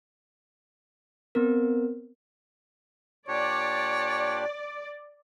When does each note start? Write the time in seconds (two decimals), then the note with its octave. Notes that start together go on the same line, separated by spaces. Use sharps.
1.35 B3 C4 A#4
3.28 A#2 D4 G4 C#5 D5